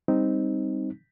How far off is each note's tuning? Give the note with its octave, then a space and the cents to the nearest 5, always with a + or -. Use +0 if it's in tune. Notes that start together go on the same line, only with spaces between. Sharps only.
G3 +25 C4 +0 D#4 +0